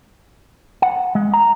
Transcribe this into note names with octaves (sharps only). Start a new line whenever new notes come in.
F#5
G#3
A#5